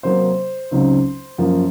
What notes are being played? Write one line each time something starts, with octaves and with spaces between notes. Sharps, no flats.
C3 F#3 A#3 C5
C#2 C#3 F#3 C4 D#4
F#2 F3 A#3